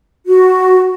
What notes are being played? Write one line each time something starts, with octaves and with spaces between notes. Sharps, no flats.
F#4